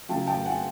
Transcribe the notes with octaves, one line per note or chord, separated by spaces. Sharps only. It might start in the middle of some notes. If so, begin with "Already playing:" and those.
C#3 F#3 G5 A5
G5 A5
F#5 G#5